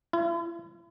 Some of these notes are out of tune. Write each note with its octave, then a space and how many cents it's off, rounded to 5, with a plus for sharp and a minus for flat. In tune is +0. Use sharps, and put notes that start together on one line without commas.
E4 +45